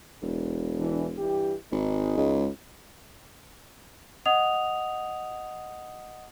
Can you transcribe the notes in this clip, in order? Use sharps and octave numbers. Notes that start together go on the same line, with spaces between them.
E1
E3 D4
G2 E3 G4
G#1 G#3 D#4
C#2
D#5 F#5 D#6 F7